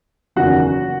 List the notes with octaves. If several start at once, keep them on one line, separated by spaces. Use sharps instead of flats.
F#1 E2 D#3 A#3 C#4 F#4 F#5